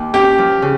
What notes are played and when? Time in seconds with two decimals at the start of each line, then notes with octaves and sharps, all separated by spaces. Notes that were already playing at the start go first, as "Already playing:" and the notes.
Already playing: D#2
0.14 C#4 G4
0.38 F3
0.62 C#3